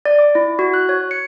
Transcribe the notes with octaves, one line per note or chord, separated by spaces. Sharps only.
D5
D6
E4
F#4
F#6
C#5
C#7